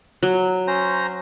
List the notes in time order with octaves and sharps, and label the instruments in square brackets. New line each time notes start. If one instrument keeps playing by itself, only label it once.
[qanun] F#3
[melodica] C#4 C5 A#5